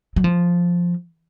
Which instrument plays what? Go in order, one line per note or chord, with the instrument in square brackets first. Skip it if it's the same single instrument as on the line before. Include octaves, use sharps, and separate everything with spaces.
[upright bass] F#3
F3